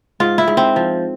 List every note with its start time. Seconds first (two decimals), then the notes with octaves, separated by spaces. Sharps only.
0.20 G#2 F4
0.38 E4
0.48 G#2
0.57 C4
0.76 F3